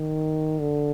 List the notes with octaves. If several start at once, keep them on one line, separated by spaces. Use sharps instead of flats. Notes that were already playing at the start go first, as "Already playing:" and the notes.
Already playing: D#3
D3